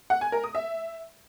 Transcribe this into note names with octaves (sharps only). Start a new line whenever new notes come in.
F#5
G#5
A#4
D#6
E5